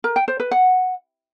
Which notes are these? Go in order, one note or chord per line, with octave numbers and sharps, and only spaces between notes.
A#4
G5
C5
B4
F#5